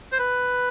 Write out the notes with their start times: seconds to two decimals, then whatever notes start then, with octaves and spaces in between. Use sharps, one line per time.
0.12 C5
0.19 B4